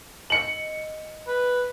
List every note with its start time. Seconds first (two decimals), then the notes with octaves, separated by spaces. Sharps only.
0.30 D#5 E6 C#7 F#7
1.27 B4